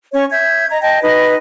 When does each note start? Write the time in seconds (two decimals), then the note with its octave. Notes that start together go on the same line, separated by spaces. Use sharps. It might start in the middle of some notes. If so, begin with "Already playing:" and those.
0.13 C#4 C#5 C#6
0.32 E5 G6 G#6
0.70 D#5 A#5
0.81 D#5 G5 A5
1.02 D#4 B4 D#5